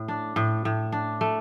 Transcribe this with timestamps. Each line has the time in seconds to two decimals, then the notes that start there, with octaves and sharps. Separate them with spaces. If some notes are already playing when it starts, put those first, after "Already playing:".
Already playing: A2
0.08 D4
0.36 A2
0.65 A2
0.92 D4
1.21 A3